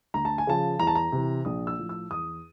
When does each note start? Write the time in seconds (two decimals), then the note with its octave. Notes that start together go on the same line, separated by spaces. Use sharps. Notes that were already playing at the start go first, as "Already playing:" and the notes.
0.14 D2 A#5
0.25 A5
0.38 G#5
0.47 C#3 F3 A5
0.80 E2 A#5
0.87 A5
0.95 A#5
1.12 C3 E3
1.45 A#1 D#6
1.67 E6
1.79 A2 F3
1.89 E6
2.11 E2 D#6